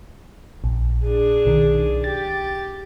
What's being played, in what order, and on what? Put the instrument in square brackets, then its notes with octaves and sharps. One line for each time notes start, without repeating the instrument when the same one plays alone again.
[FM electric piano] A#1
[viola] D4 G#4
[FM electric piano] B1 D#3
[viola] G4 [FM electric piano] A6